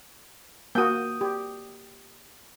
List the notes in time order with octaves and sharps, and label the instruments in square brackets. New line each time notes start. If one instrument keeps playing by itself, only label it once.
[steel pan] A#3 F#4 [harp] G5 D#6
[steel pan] G4